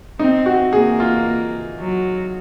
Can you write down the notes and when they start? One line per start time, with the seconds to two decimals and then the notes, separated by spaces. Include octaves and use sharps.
0.19 C4 D#4
0.46 F#4
0.73 A#3 G#4
1.00 F4
1.80 F#3